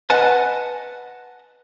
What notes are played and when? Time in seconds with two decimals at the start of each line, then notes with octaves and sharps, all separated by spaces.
0.10 B4 D#5 F#5 G#5 A5